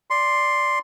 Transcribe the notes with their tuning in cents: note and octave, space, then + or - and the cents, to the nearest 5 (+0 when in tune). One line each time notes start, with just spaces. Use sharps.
D5 +0 C6 +0